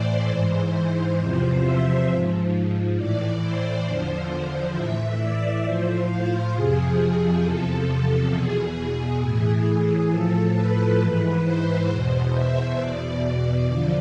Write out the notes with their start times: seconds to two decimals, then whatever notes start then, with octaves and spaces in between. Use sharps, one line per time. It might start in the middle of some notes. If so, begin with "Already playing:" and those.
Already playing: A2 E3 C5 D5
0.29 G#2 E3
0.73 C5
1.18 E2 C3 F3
1.62 E5
2.08 G#2 F3
2.97 A2 E3 D5
3.41 C5
3.86 E2 D3 F3 C5
4.75 A2 E3 E5
5.20 D5
5.64 A2 F3 C5
6.08 F4
6.54 F2 C3 F3 G#4
6.97 G#4
7.42 E2 C3 F3 A4
8.32 E2 B2 G#4
9.20 A2 E3 G#4
10.10 A2 F3 A4
10.54 B4
10.99 G#2 E3 B4
11.43 C5
11.88 E2 B2
12.34 E5
12.77 E2 B2 D5
13.22 D5
13.66 E2 D3 F3